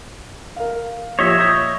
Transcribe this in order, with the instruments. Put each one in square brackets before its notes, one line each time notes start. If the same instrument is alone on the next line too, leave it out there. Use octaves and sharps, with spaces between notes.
[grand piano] A#4 F5
[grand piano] A#2 F3 G4 [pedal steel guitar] C#5 D#5 E5
[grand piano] C#6 G6 A#6